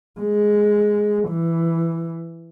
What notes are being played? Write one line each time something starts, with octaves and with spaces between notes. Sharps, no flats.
G#3
E3